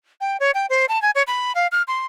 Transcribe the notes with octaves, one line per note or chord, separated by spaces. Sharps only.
G5
C#5
G5
C5
A5
G#5
C#5
B5
F5
F6
C6